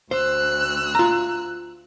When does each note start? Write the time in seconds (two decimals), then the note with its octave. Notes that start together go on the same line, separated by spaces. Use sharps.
0.11 D2 C5 E6 F#6
0.95 F4 A#5